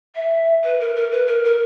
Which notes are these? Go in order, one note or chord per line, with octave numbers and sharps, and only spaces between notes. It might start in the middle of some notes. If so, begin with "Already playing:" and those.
E5
B4
A#4
A#4
B4
A#4
A#4